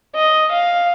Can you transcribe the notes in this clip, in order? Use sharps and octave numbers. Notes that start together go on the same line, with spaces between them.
D#5
F5